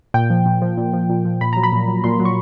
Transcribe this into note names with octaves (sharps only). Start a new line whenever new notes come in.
A#2 G5
F3
A#2
F3
A#2
F3
A#2
F3
A#2 B5
F#3 A#5
B5
A#2
F#3
A#2 C6
F#3
C#6